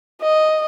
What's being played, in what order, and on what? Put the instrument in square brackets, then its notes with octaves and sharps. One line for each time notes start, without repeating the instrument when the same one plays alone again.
[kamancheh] D#5